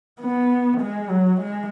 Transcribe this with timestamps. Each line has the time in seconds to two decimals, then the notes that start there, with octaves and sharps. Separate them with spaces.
0.21 B3
0.81 G#3
1.10 F#3
1.41 G#3